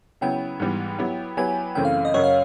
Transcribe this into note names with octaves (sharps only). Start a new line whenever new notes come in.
C#3 F#3 B3 E4 G5
G#2 E3 G3 B3
F#3 B3 E4 G4
F#3 B3 E4 G4 B4 G#5
F#2 C#3 E3 A3 C4 G5
F5
D#5
F#2 C#3 F#3 C#5
F5